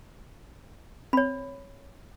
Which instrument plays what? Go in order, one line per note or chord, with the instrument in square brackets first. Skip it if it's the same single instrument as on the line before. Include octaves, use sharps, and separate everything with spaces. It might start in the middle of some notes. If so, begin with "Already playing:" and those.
[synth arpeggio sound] C4 [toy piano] C#5 B5